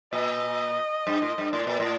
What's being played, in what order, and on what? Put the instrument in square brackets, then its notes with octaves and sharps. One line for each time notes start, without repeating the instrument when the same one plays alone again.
[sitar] A#2 [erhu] D#5
[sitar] G2
A2
G2
[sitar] A2 [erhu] D5
[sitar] A#2
A2